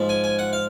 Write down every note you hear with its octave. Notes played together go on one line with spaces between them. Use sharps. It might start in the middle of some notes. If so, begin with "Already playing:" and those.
Already playing: G#2 F3 G#3
G#5
G#5
F#5
F5